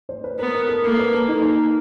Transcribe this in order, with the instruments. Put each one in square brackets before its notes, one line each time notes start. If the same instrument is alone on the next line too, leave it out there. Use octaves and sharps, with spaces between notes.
[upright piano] C5
B4
[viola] B3 [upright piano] A#4
[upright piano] A#4
A4
[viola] A#3 [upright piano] A#4
[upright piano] B4
A4
[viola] A#3 [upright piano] D#4